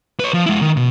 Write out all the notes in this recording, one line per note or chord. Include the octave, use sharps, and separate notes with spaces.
B4 C#5
F3
G#3 E4
D#3
B2